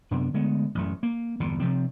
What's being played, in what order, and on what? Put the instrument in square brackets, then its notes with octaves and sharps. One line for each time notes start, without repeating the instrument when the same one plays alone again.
[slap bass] F#2 C3 B3 D4
D3 G#3 A3 B3
A1 F#2 A3
A#3
G1 E2 A#2
C3 F3 C4